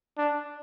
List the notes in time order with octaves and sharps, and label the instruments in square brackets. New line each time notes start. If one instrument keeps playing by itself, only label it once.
[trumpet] D4